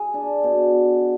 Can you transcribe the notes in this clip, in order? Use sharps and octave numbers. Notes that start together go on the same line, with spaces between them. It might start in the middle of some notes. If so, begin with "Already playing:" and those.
Already playing: G#4
D4
B2